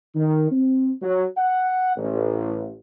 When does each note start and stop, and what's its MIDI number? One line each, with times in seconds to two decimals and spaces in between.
0.15 0.48 51
0.51 0.92 60
1.02 1.25 54
1.37 1.92 78
1.97 2.76 33